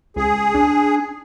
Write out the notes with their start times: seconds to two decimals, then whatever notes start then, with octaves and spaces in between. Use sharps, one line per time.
0.16 C#2 G#4
0.54 D4